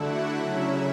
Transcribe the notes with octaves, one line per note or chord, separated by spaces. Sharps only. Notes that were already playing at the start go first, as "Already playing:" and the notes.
Already playing: D3 A3 D4 E4 F#4 E5 F#5
C#3 F#3 C#4 E4 E5